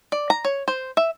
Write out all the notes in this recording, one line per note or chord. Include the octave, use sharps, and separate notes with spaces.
D5
A#5
C#5
C5
E5